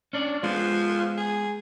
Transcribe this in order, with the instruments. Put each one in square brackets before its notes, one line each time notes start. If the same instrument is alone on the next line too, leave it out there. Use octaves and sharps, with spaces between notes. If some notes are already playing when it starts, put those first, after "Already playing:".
[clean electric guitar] C#4 D4 D5
[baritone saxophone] F3 [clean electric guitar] G#3 B3
[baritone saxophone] G#4